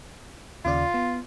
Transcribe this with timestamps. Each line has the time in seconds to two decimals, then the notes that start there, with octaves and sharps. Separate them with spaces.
0.65 D#2 C#3 F4 D5
0.94 B3